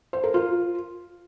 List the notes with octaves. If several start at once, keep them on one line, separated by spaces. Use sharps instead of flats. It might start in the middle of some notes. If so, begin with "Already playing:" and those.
C5
A#4
F4